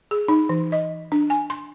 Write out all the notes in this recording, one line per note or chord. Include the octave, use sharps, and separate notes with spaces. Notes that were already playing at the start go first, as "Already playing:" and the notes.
G#4
D#4
E3
D#5
D4
G#5
C6